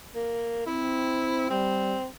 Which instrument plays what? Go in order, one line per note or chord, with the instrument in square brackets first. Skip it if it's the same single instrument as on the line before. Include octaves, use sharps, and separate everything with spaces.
[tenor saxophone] A#3
[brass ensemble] C4 [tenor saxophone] E4
[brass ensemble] G3 [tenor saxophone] C4